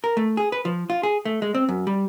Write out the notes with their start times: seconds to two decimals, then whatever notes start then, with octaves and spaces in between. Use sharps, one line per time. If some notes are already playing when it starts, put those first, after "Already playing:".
0.04 A#4
0.17 A3
0.37 G#4
0.52 B4
0.65 F3
0.90 F4
1.03 G#4
1.25 A3
1.42 G#3
1.55 C4
1.69 F#2
1.87 G3